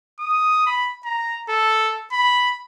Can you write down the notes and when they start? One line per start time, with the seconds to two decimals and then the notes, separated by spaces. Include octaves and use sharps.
0.19 D#6
0.66 B5
1.05 A#5
1.49 A4
2.12 B5